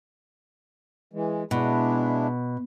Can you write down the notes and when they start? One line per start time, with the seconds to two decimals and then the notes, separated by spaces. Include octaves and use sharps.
1.13 E3 G#3
1.51 B2 G#3 D4 E4